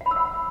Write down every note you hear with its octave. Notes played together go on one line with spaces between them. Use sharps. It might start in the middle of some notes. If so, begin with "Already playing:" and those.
F#5
B5
E6
F#5